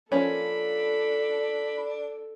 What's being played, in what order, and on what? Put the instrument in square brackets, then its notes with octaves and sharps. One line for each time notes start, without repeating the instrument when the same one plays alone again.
[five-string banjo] F3 A#3 C#4 [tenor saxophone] D4 [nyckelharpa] A4 [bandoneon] B5